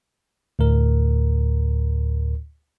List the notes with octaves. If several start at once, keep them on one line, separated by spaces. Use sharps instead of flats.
D2 A2 A#4